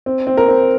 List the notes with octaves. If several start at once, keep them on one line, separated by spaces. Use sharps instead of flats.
C4
C4
A#4
C4